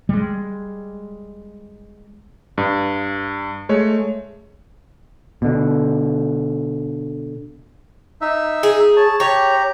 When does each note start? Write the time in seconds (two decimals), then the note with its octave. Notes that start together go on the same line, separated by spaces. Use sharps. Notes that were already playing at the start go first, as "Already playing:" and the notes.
0.09 G3 G#3
2.58 G2
3.69 G#3 A3 C#5
5.42 B2 D3
8.21 D#4 E5
8.63 G#4
8.97 C#5 A5
9.20 G4 C#5 A#5